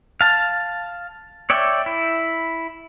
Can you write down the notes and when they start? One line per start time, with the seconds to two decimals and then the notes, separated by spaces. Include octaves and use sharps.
0.21 F5 A5
1.50 C#5 D5 E5 G5
1.86 E4